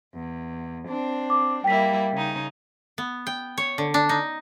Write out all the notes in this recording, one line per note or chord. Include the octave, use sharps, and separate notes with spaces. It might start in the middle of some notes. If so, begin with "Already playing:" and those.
E2
C4 D4
D6
G3 A#3 E4 G5 B6
C#3 D#4
B3
G5
C#5
D3
D4
D#4